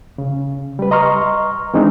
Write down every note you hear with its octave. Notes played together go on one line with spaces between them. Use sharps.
C#3
G3 B4
D#5 A#5 C6 C#6 F6
E3 G#3 C4 D4 D#4